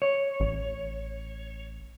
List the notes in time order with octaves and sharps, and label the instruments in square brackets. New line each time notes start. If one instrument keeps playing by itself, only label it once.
[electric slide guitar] C#5
[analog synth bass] A1